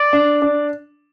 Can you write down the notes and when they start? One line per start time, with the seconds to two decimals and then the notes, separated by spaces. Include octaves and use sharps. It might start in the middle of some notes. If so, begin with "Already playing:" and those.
Already playing: D5
0.13 D4
0.42 D4